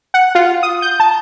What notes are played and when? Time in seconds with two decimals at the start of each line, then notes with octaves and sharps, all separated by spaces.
0.14 F#5
0.35 F4
0.63 D#6
0.82 G6
1.00 A5